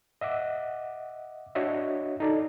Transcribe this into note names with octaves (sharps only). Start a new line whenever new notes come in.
D#5 E5 F#5 D6
D4 F#4 C#5 D#5 E5
D#4 A4 D5